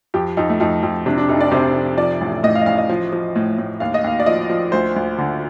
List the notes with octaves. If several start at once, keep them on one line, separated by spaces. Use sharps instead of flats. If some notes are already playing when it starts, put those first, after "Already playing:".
F2 G4
F2 D#4
A3
F2 D#4
F2
C3 D4
D4
F1 D#4
D5
C3 C5
F1
F3 D5
A1
A2 D#5
F5
D#5
A1 F5
D#5
F3
F3
A2
A2
D#2 F5
D#5
D#2 F5
D5
F3 D#5
F3
D2 C5
D2
D3